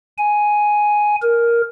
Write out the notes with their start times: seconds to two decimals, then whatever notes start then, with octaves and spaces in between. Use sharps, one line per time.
0.18 G#5
1.22 A#4